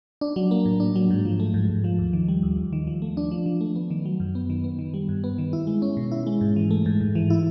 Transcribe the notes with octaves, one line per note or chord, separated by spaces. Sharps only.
D4
F#3
A#3
A2
D4
F#3
G#2
F3
A3
G#2
G#2
F3
D#2
D#3
G3
D#2
D#2
D#3
F3
A3
D4
F3
F3
A3
B3
D#3
F#3
F#2
B3
D#3
B3
D#3
G3
G2
B3
D#3
E4
G#3
C#4
B2
E4
G#3
G#2
E3
A3
G#2
G#2
E3
E4